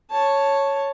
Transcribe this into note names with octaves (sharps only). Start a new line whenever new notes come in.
C#5 A5